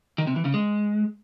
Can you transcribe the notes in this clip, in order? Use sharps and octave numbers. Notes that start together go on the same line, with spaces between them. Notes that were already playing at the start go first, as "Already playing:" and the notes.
D#3
C3
E3
C#3
G#3